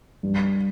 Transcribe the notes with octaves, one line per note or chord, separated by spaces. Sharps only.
G2